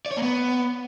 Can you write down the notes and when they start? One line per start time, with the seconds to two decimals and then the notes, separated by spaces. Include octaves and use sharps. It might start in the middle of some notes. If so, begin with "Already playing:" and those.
0.06 D5
0.11 C#5
0.17 A#3
0.22 B3